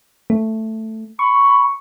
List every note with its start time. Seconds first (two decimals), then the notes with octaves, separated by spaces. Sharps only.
0.30 A3
1.19 B5 C#6